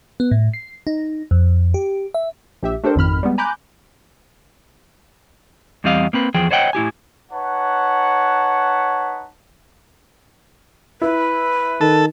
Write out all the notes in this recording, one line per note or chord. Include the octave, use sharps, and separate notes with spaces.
B3
A2
C7
D#4
F2
G4
E5
A#1 G4 E5
A3 D4 G4 A4 A#4 C5
G#1 F2 D#3 B5 F6
G3 G#3 B3
G#5 A#5 B5 D6 F#6 G6
E2 G3 C4 G4 D#5 F5
A#3 C4 B4
E2 F3 G#4 G5
C5 C#5 D#5 F#5 G5
A2 E4 G4 G#5
D#4 B4 C#5 F#5 A5
E4 B4
D#3 A4